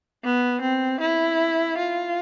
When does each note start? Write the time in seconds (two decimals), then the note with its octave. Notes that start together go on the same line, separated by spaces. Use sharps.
0.24 B3
0.62 C4
1.00 E4
1.79 F4